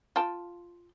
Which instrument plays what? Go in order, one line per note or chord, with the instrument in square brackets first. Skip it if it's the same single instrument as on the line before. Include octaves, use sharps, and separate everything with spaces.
[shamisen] F4 G5 A5